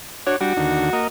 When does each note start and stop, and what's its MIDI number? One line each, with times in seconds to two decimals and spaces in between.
0.26 0.36 62
0.26 0.36 66
0.26 0.35 73
0.41 0.53 55
0.41 0.53 62
0.41 1.05 66
0.57 0.90 39
0.57 0.90 50
0.93 1.08 58
0.93 1.08 75